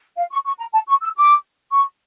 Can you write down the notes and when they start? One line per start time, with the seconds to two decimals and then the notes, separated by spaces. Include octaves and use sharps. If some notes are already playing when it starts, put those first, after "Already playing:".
0.17 F5
0.31 C#6
0.45 C#6
0.59 A#5
0.73 A5
0.88 C#6
1.02 E6
1.16 D6
1.72 C#6